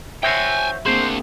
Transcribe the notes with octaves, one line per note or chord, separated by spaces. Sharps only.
F#4 C5 C#5 E5 G5 G#5
A#3 C4 D4 F#4 G#4 C5